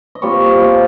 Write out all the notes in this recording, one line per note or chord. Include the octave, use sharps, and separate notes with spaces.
D#5
A#2 G3 C4 C#5
D#5
A#2 G3 C4 F5